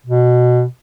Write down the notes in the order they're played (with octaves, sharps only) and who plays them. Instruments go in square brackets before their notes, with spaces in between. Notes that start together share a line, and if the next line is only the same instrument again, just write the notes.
[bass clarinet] B2